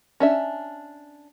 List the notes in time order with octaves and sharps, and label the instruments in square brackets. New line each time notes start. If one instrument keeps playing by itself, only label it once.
[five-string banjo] C#4 D4 E5